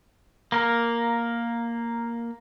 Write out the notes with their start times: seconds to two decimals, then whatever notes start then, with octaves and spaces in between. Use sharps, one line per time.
0.52 A#3 A#4